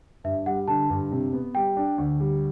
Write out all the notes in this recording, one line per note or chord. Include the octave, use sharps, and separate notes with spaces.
G2 E5
G3 F#5
D3 A5
G2
C3
B3
G3 G5
D4
D2
G3